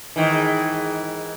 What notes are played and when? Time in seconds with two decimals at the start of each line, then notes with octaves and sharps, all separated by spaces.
0.16 G#2 D#3 E3